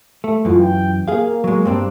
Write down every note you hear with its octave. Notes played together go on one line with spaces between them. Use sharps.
A3
F#2 E3 F4
G5
A#3 G#4 F5
F#3 G#3
G2 C4 D4